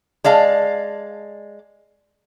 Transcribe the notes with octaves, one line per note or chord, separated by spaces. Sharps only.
G#3 D5 F5 A5